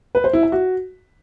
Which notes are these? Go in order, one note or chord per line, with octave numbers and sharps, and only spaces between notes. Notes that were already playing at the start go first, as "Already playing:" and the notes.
B4
C5
E4
E5
F#4